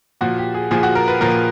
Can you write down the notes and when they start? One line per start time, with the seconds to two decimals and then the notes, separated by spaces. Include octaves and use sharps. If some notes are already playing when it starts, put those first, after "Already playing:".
0.21 A#2 F3 F#4
0.38 G4
0.54 G#4
0.71 A#2 F3 G#4
0.83 F#4
0.95 A#4
1.08 B4
1.21 A#2 F3 A#4